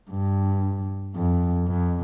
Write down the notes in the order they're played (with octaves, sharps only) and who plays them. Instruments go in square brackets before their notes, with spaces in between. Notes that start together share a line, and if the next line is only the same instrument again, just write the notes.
[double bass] G2
F2
F2